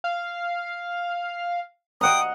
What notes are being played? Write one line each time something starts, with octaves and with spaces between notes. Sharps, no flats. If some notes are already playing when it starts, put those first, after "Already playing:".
F5
D#5 F#5 G5 A#5 D#6